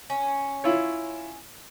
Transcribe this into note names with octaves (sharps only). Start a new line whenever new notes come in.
C#4
E4 F4 C#5